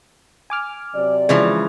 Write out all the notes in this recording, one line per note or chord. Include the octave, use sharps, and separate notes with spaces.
G#5 D6 F6
C3 F#3 D5
C#3 E3 F3 G#3